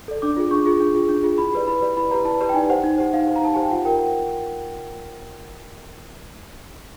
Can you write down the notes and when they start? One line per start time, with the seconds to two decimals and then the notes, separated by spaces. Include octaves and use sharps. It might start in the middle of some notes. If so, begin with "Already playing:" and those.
0.08 A4 D5
0.22 D4 D6
0.37 F4 G#4
0.51 D4 C#6
0.66 F4 G#4
0.80 D4
0.95 F4 G#4
1.09 D4
1.23 F4 G#4
1.38 E4 B5
1.53 G4 B4 D5
1.67 E4 B5
1.81 G4 B4 D5
1.97 E4 B5
2.11 G4 B4 D5 A#5
2.25 E4 A5
2.40 G4 B4 D5
2.49 G5
2.54 D#4 G#5
2.69 G4 C5 F#5
2.83 D#4
2.98 G4 C5
3.13 D#4 F5
3.27 G4 C5
3.36 A#5
3.41 D#4 A5
3.54 G4 C5 G#5
3.62 G5
3.71 F4 F#5
3.85 A#4 G5